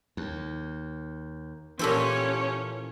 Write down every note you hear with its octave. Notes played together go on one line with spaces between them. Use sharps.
D#2
A#2 E3 C#4 G4 A4 C5 C#5